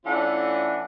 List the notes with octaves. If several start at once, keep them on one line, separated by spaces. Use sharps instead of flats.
E3 A3 C#4 D4 F4 F#5